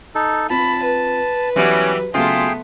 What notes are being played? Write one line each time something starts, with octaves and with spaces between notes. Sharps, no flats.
D#4 A4
C4 F4 A5 B5
B4
E3 F#3 G3 B3 C#4 G4 E5
C#3 F#3 A3 B3 F4 G#4 G5 C6